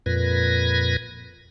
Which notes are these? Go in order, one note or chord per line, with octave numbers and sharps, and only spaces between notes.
F2 A#2 B4 G#6 A#6